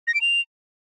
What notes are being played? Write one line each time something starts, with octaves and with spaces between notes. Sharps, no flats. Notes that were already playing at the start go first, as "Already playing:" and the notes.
A#6
D7
F7